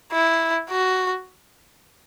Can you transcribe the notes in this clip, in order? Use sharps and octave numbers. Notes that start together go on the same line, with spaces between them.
E4
F#4